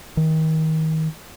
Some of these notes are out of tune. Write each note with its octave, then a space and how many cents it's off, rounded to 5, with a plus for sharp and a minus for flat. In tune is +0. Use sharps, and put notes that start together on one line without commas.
D#3 +30